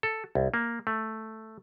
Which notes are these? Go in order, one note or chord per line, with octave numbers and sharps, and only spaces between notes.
A4
C2
A#3
A3